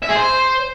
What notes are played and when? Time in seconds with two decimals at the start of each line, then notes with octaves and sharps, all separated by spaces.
0.03 E5
0.09 G#4
0.16 C5